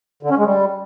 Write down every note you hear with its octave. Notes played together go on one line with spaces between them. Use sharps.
D3
C#4
G#3
G3